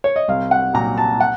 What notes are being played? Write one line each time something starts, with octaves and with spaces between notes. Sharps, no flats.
C#5
D#5
C2 F5
F#5
A#2 F#3 A#5
A5
F#5